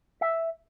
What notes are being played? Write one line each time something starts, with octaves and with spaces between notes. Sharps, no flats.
E5